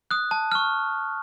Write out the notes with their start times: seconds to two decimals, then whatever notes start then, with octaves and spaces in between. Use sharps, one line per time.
0.11 D#6 F#6
0.31 A5
0.52 C#6 F6